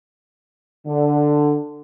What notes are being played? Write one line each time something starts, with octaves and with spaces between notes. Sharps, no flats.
D3